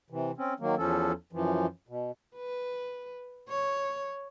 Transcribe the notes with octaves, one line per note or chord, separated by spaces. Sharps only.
C3 E3
C4 C#4
D#3 F#3 A#3
E2 F3 C#4 A4
F#2 E3 F3
B2
B4
C#5